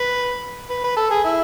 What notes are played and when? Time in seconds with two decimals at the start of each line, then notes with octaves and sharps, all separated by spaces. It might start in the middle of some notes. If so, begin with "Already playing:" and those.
Already playing: B4
0.70 B4
0.84 B4
0.97 A4
1.11 G#4
1.25 E4